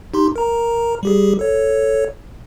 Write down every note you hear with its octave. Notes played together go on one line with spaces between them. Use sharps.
D#4 G4 C6
A#4 A#5
G3 G4 G#4
A4 C#5